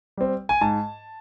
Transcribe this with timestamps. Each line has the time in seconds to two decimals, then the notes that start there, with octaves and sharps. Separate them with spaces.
0.17 G3 C4
0.49 G#5
0.61 G#2 A5